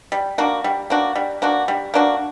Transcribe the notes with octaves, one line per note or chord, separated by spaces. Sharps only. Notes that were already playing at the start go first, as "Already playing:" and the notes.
G3
A#3 D4 F#4
G3
A#3 D4 F#4
G3
A#3 D4 F#4
G3
A#3 D4 F#4